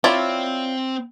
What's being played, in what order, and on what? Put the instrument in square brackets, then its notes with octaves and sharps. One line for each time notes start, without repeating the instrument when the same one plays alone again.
[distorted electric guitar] C4 [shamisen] E4 [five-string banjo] F4 C#5 D5